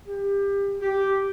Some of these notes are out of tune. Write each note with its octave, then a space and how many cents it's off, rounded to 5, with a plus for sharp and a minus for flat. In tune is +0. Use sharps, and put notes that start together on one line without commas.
G4 +25
G4 -5